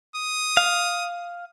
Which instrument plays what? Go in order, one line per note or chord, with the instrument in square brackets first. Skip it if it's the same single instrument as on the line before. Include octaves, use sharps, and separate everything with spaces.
[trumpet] D#6
[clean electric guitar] F5